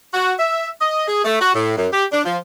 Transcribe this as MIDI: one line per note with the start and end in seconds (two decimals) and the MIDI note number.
0.14 0.34 66
0.39 0.69 76
0.81 1.04 75
1.08 1.22 68
1.25 1.36 57
1.41 1.51 66
1.55 1.77 45
1.77 1.87 42
1.92 2.05 67
2.12 2.22 62
2.25 2.38 53